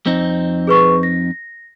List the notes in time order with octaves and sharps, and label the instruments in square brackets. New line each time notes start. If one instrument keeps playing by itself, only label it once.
[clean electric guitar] F2 C4 D#4
[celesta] G#4 B4 C#6
A#6